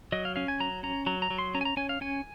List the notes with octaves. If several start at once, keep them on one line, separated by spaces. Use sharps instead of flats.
F#3 D#5
F5
C#4 F5
G#5
F#3 A#5
C#4 A#5
F#3 A#5
A#5
F#3
C6
C#4 A#5
G#5
A#5
C#4 G#5
F5
C#4 G#5